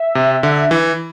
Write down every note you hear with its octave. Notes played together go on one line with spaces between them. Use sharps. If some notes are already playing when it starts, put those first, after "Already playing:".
Already playing: E5
C3
D3
E3